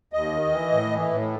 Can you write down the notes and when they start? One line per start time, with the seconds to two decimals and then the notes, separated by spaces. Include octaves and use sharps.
0.13 D#2 D#5
0.32 D#3
0.52 E3
0.72 A2
0.91 E3
1.10 A2